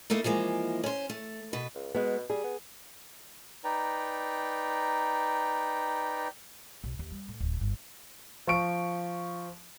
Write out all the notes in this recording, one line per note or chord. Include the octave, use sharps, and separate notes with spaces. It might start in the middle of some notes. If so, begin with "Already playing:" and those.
A3 A#3 D#4 E4
E3 F3 G#3 A#3
C#4 C5
A3
B2 B4
C#2
B2 G#3 B3
G3 G#4
B3
D#4 B4 D5 G5 A#5
B1
D#2
G3
A2
D1
G1
F3 C#6 D7